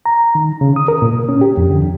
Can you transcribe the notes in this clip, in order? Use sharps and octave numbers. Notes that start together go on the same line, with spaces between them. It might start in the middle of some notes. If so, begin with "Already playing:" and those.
A#5
D#3
C#3
D#6
A#4
A#2
C#4
G4
F2
D3
F2